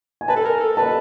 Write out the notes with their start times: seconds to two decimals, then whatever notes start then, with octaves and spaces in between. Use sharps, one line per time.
0.21 G#5
0.28 B4 A5
0.36 A4
0.45 A#4
0.60 A4
0.77 B4 A5